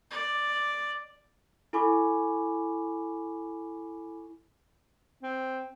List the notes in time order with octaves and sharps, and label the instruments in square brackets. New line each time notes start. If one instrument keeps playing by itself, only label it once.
[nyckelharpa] D5
[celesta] E4 A4 G#5 B5 C#6 D6
[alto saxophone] C4